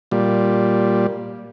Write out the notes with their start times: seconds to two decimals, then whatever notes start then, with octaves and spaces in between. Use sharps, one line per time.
0.12 A#2 G3